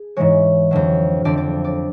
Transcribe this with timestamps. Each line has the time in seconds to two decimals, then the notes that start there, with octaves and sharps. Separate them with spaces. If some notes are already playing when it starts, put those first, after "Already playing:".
Already playing: G#4
0.17 G#2 E3 G#3 C#5
0.71 F2 D3 F#3
1.25 F2 D3 F3 D5
1.37 D5
1.64 D5